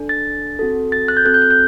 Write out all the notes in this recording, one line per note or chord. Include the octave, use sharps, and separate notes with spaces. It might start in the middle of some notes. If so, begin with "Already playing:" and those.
Already playing: D4 A4
A6
C4 F#4 A4
A6
F#6
G6
C4 F#4 A4 F#6
G6
F#6
G6